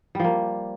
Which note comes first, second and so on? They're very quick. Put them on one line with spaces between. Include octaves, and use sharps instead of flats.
G3 F3 A#3